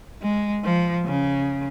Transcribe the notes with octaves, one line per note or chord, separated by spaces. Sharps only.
G#3
F3
C#3